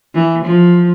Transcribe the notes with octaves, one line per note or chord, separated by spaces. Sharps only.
E3
F3